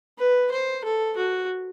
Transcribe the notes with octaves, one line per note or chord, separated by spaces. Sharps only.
B4
C5
A4
F#4